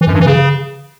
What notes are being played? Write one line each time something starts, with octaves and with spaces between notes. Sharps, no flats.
E3
F#2
G2
E3
C#3